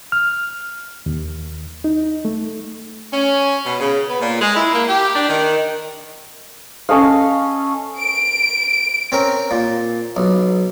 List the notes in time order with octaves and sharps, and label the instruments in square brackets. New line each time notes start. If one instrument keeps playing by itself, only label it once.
[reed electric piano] F6
D#2
D#4
A3
[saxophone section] C#4
B2
C#3
B3
A#2
G#3
E4
A#3
G4
D4
D#3
[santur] C#4 A4 D#5 F5
[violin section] D7
[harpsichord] C4 C#4 A#4
A#2
B1